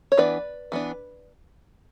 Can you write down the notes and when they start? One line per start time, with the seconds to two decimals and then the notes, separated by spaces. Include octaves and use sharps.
0.12 C#5
0.17 E3 B3 D4 B4 D5
0.72 E3 B3 D4